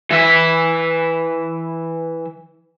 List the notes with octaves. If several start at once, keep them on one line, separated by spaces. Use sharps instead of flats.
E3 E5